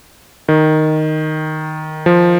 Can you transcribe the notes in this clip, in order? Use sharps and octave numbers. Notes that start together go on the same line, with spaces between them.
D#3
F3